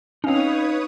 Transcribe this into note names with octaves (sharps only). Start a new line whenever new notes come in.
C4 C#4 D#4 B4 C#5 F5 D#6